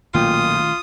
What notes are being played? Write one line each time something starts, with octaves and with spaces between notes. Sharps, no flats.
B1 A#2 D#3 A3 C#4 F4 G5 D#6